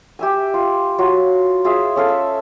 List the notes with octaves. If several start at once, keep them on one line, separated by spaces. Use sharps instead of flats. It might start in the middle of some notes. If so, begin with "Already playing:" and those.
G4 E5 G#5
F4
F#3 F4 F#4
F4 G#4 E5
C#4 A4 F5
E5